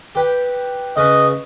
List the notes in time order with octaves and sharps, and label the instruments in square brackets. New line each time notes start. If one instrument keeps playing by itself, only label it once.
[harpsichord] G4 B4 G5
[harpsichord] C#3 C#4 B4 [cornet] D#5